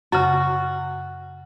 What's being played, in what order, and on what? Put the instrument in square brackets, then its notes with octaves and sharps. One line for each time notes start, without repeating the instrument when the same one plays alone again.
[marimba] F#2 C#3 [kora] F#4